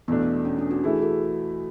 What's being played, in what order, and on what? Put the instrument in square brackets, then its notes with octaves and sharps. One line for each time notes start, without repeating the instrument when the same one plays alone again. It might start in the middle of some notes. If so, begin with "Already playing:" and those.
[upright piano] E2 B2 A3 D4 [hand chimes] B3
[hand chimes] C#4
D4
F#4
[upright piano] E3 A3 E4 [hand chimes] G#4
[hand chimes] F#4 A4